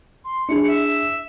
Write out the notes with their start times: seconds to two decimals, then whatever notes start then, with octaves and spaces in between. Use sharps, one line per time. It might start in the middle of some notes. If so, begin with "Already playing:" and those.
0.25 C6
0.49 D4 E4 G#4 C#7
0.67 E5